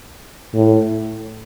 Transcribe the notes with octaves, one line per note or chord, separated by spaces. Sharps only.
A2